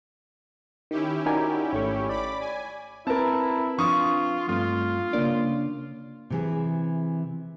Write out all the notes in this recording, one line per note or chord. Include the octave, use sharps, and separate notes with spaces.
D#3 C#4 E4 G4
D#4 F#4 A#4 D5 G#5
G#1 A3 C#5 C#6
D5 B5 D6
G#5
C4 E4 A#4 B4 A5
F3 D4 F4 A5 C#6 D#6
G2 A3 C4 F4
C#3 A#3 D4 D5
C3 E3 G#4